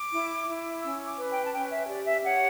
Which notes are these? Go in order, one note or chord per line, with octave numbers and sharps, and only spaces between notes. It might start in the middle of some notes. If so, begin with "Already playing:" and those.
Already playing: D6
E4
E4
C#4 E6
D6
B4
G5
A5
C#4 G5
E5
G4 D5
E5
C#5 F#5